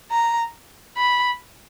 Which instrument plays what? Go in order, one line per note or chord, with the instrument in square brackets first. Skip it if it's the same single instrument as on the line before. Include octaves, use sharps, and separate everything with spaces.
[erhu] A#5
B5